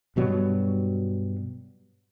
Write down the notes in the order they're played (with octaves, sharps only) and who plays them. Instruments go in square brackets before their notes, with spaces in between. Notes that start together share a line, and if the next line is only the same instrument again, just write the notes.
[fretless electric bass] G2 B2 F#3 G3